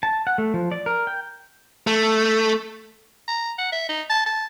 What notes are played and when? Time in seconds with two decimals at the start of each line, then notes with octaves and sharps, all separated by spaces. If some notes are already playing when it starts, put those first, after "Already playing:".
0.03 A5
0.27 F#5
0.38 A3
0.54 F3
0.72 D5
0.86 A#4
1.07 G5
1.87 A3
3.28 A#5
3.58 F#5
3.72 E5
3.89 D#4
4.10 A5
4.26 A5